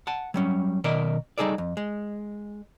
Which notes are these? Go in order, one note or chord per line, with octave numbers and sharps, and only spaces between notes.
F#5 A5
F#3 G3 C#4
B2 D#3 A#4 D5 E5
G3 D#4 G#4 A4 D5
F2
G#3